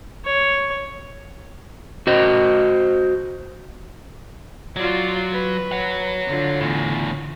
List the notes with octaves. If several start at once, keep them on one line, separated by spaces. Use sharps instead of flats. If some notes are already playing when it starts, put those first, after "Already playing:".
C#5
F#4 C5 D#5
F#3 F4 D5
B4
C#5 F#5
D3 F4
E2 A2